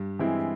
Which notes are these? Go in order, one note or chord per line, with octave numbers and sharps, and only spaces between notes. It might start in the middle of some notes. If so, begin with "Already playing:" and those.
Already playing: G2
E3 G#3 C4 E4